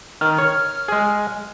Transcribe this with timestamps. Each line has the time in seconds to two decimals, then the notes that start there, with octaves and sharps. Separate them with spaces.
0.21 D#3 F6
0.38 C#5
0.88 G#3 G#4